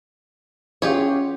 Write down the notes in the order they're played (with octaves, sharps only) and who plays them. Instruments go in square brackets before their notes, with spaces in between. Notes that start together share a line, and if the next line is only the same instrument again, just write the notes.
[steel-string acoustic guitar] C#4 G#4 F#5 [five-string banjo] F4 G4 C#5